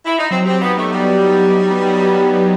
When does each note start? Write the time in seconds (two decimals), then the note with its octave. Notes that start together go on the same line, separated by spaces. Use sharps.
0.06 E4
0.18 D#4
0.30 F#3 C4
0.46 C4 G4
0.61 B3 D#4
0.77 A3 B3
0.92 G3 B3
1.08 F#3
1.24 D#4
1.40 D#4
1.55 F#3
1.71 B3
1.87 F#3
2.02 B3
2.17 F#3
2.33 F#3